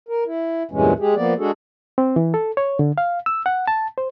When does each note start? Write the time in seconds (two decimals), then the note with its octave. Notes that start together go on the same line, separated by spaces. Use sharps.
0.08 A#4
0.27 E4
0.71 E2 G2 A#2 E3 G#3 C#4
0.99 G#3 G4 G#4
1.15 F3 A#3 B3 D5
1.38 G#3 D4 F#4 G#4 A4
1.98 C4
2.16 E3
2.34 A4
2.57 C#5
2.79 D3
2.98 F5
3.26 E6
3.46 F#5
3.67 A5
3.98 C5